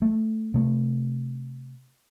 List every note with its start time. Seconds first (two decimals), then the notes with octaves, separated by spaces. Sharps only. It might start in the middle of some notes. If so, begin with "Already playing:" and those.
0.02 A3
0.54 C3 A3